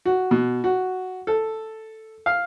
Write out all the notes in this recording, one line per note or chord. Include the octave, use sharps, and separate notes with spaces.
F#4
B2
F#4
A4
F5